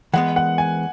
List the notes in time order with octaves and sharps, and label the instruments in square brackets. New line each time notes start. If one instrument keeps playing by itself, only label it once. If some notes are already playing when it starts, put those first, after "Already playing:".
[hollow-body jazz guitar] E3 G#3 B3 [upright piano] F#5
[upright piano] F#5
G#5